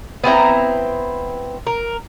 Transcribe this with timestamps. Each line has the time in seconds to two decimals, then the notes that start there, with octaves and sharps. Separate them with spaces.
0.24 B3 C4 E4 A#5
1.67 A#4